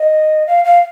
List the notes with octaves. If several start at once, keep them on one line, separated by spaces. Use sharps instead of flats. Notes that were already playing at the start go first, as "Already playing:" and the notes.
Already playing: D#5
F5
F5